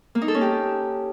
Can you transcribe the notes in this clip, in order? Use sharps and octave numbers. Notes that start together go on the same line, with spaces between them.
A#3
D#4
A4
C#4
G4